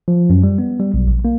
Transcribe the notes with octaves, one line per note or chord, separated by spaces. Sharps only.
F3
F#2
G3
B3
G3
B1
A#1
A#3